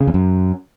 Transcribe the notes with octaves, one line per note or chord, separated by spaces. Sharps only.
C#3
E2
F#2